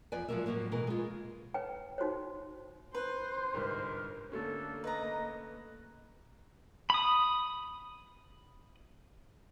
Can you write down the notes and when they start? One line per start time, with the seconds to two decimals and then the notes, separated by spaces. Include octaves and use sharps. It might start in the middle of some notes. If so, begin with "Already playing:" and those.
0.12 E2 F3 B4 D5 G#5
0.28 F3 F#3 G#3 A#3 A#4 E5
0.46 F2 A2 F3 F#3 A#3
0.72 B2 E3 G#3 A#4
0.87 G#3 F4
1.54 B4 C#5 G5
1.98 D#4 F#4 C5 C#5
2.95 B4 C5
3.53 G1 C2 G#2 A#4
4.32 D3 A3 A#3 C#4 A4
4.84 B4 D#5 A#5
6.90 B5 D#6